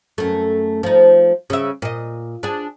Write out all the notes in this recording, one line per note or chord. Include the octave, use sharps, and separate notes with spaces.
F#2 A3
F3 D#4
C#3 E5
A#2 D#5
D4 G#4